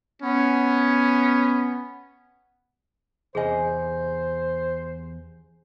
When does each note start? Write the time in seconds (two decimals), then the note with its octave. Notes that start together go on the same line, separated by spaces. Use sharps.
0.22 B3 C#4
3.35 E2 C3 G#4 C5 D#5 G#5